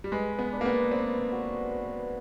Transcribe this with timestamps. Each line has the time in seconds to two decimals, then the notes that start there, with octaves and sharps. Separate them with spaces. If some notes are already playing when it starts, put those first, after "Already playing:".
0.04 G3
0.12 G#3 B4
0.39 B3
0.52 D4
0.61 A#3
0.65 B3
0.91 C4 D4
1.32 F#4
1.72 B4